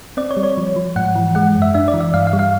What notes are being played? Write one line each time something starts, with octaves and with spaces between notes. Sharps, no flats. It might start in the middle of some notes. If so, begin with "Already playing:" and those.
C4 D5
C#5
G3
C#5
F3
F3
G#2 F#5
E3
G#3 F#5
F#2
E5
D4 E5
D5
E3
E5
G2 F5
F5
G3
F5